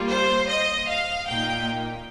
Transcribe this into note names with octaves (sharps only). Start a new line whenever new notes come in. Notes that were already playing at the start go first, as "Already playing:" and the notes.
Already playing: G3 A#3 F4
C5
D#5
F5
A#2 A#3 D#4 G5